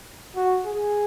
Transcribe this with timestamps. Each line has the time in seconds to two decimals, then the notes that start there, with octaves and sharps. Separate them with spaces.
0.35 F#4
0.65 G#4